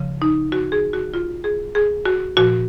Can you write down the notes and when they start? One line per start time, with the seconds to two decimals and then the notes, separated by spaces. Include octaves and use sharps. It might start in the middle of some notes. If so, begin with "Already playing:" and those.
Already playing: C#3 F3
0.22 D#4
0.52 F#4
0.72 G#4
0.93 F#4
1.14 F4
1.44 G#4
1.75 G#4
2.06 F#4
2.37 A#2 F3 F#4